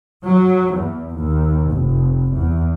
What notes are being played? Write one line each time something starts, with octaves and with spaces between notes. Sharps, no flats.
F#3
E2
D#2
F1
E2